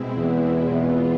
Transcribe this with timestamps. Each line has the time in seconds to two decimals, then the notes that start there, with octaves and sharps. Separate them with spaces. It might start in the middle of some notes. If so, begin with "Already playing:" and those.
Already playing: B2 G#3 C4 E4
0.16 E2
0.70 E2 E3 B3 F4